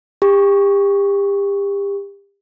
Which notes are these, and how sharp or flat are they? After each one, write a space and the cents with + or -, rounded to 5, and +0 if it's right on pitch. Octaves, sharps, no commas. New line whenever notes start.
G4 +30 C#6 +0